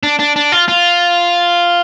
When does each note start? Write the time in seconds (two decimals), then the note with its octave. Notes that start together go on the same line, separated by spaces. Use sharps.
0.03 D4
0.19 D4
0.36 D4
0.52 F4
0.68 F4